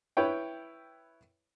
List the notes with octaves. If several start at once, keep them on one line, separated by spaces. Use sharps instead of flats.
E4 B4 C#5 G5